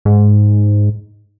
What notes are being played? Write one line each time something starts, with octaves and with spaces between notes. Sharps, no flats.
G#2